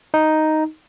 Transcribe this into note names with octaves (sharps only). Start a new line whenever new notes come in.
D#4